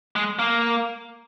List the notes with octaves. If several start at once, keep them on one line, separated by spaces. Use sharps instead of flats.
G#3
A#3